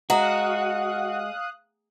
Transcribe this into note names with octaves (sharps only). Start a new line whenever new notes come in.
G#3 F#4 F5 F#5 A#5 D#6 F#6